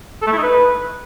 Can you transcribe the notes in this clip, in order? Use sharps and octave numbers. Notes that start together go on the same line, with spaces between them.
A4
A3
E4
D#4
B4